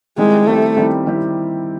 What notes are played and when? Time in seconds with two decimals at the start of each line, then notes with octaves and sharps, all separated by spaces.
0.18 D#3 G3 G#3 C4 E4 G4
0.47 D#3 G3 A3 C4 E4 G4
0.76 D#3 G3 C4 E4 G4
1.06 D#3 G3 C4 E4 G4